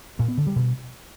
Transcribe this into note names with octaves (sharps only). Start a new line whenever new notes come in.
A#2
B3
D3
G3
B2